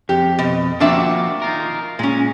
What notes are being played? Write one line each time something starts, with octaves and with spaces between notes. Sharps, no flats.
F2 G4
B2
F3 A#3 C4 D4 F#4 E5
D#4 F4 A#4
A#2 G#3 C#4